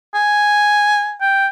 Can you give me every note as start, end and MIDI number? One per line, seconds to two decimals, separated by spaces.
0.14 1.15 80
1.21 1.47 79